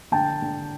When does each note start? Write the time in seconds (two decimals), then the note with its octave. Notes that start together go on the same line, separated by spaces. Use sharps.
0.12 D3 G5 A5
0.42 D3